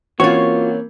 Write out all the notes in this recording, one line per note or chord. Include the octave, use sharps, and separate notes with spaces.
E3 A#3 C4 C#4 F4 F#4 C#5